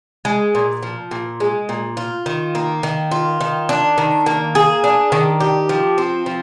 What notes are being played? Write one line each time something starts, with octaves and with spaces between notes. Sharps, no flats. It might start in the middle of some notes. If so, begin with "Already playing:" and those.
G#3
A#2
F3
A#2
G#3
A#2
F4
D#3
A#3
D#3
F4
D#3
D4
D#3
A#3
G#4
D4
D#3
G4
F3
C4
F3